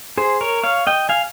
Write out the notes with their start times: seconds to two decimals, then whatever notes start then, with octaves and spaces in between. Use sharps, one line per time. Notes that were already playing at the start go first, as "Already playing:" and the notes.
0.18 G#4 C5
0.41 A#4 C#5
0.64 C#5 F5
0.87 D#5 G5
1.09 F5 G#5